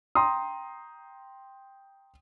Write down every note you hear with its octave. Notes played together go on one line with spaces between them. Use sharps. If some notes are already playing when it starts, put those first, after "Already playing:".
G5 A#5 C6 D#6